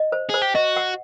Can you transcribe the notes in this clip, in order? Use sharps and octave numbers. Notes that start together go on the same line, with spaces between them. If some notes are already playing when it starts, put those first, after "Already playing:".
Already playing: D#5
C5
G#4 C5
G4
F#4 D#5
F#5